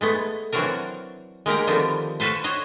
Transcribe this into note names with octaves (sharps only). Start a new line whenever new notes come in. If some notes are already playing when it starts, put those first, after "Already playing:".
G#3 A3 B3
E3 F#3 C4 D4 F#4 A#4
G#3 A#3 G4 A#5
D3 D#3 F3 G3 B3 C4
F4 F#4 A4 B4 C5
F#4 C5 C#5 D#5 F#5